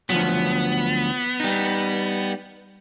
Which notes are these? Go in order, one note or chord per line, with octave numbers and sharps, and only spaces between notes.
D2 F3 F#3 B3
G3 D#4